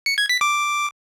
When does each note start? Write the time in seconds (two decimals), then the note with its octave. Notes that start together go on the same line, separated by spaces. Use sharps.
0.06 C#7
0.18 G#6
0.29 B6
0.41 D6